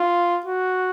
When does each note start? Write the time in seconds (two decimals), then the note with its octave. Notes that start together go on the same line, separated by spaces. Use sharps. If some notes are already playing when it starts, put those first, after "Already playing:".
Already playing: F4
0.46 F#4